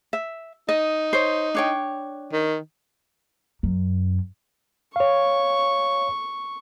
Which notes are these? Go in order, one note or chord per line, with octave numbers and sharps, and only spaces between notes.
E5
D#4 D#5
C5 C#5
D4 C#5 G5
D#3
F#2
C#5 F5 C#6